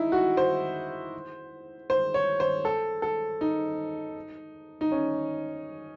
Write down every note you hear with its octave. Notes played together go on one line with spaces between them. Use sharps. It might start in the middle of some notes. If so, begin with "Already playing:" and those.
Already playing: D#4 E4
F#4
C5
C5
C#5
C5
A4
A4
D#4
D#4
C#4